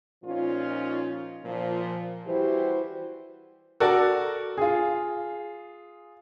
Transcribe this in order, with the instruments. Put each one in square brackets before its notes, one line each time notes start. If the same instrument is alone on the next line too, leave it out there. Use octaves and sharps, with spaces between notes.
[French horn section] A#2 F3 C#4 D#4 F4
A#2 F3
E3 G3 E4 F#4 G4 C5
[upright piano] F#4 A4 A#4 D5
F4 G#4